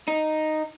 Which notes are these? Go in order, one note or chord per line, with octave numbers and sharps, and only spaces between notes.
D#4